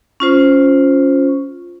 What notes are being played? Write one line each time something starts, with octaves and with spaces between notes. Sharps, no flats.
C#4 F4 C5